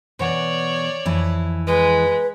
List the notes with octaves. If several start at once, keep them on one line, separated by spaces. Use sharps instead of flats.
B2 E3 C#5 D5 F#5
F2 E3 E4
G#3 B4